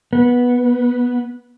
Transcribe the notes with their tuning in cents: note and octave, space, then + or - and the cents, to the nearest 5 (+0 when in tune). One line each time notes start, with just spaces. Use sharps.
B3 -10